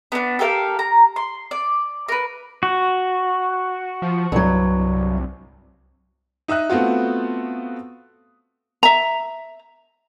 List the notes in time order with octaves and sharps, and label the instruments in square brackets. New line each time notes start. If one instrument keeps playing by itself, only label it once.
[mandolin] B3 D4
G4 A4 A#4 F5
A#5
C6
D5
A#4 B4
[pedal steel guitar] F#4
[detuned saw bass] F3
[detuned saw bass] C2 [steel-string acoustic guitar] G2 F#3
[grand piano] D#4 E5 D#6 F#6
A3 B3 C4 F4 F#4
[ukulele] E5 A#5